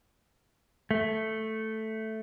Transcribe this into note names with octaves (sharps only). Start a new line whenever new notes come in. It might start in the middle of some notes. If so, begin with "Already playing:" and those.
A3